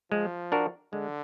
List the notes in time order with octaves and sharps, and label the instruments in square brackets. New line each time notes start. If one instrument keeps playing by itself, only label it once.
[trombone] F3 [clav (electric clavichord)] G#3
[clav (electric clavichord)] D4 F#4 A#4
[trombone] D3 [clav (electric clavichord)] G#3